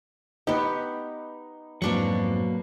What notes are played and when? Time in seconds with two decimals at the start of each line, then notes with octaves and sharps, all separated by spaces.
0.47 B3 D#4 G4
1.82 F2 G#2 B2 F#3 A#3 C4 D4 C#6